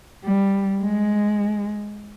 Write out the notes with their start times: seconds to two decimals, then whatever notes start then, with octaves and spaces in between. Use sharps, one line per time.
0.24 G3
0.83 G#3